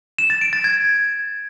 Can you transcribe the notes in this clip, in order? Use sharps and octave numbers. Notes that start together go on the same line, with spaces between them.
E7
A6
D7
A6
G#6